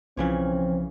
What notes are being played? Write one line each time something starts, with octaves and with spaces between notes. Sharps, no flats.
B1 C#3 E3 F3 C4 C#5